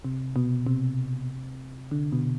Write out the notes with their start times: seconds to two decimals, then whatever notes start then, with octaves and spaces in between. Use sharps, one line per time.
0.05 C3
0.36 B2
0.67 C3
1.91 D3
2.12 B2